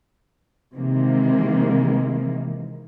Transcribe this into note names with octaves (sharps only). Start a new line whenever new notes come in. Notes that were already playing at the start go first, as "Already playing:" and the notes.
C3 D#3 E3 G#3 A#3